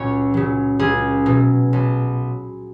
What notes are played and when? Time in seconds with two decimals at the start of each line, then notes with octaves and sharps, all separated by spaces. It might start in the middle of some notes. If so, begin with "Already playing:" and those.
Already playing: C#2 A#2 F#3 C#5
0.34 C#3 F#3
0.79 C#2 G#4
1.26 B2 F#3
1.73 B1